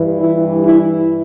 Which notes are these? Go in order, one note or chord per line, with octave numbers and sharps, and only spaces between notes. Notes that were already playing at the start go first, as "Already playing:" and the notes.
Already playing: G2 E3
E4
E4